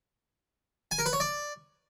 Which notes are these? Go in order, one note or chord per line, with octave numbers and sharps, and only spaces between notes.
G#5
A#4
B4
C#5
D5